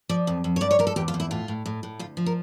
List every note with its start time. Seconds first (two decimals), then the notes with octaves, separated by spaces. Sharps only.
0.09 F3 D5
0.27 F2
0.44 F2
0.56 C#5
0.61 G2 D5
0.71 C#5
0.79 G2 A#4
0.87 A4
0.96 E2 G4
1.08 F4
1.14 E2
1.20 E4
1.31 A2 F4
1.48 A2
1.66 A2
1.83 A2
1.99 D2 F4
2.17 F3
2.26 A#4